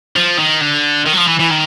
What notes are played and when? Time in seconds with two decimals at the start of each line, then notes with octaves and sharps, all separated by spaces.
0.16 F3
0.39 D#3
0.61 D3
1.06 D#3
1.13 F#3
1.18 F3
1.28 E3
1.40 E3
1.51 D#3